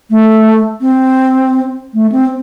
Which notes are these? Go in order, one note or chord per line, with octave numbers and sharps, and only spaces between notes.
A3
C4
A3
C4